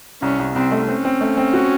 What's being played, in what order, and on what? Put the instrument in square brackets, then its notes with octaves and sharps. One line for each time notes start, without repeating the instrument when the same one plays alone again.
[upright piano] C2 [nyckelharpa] C#4
[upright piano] C2
[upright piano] C2 [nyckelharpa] C4
[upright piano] A3
[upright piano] C4 [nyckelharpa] C#4
[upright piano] C4
A3
C4
F#4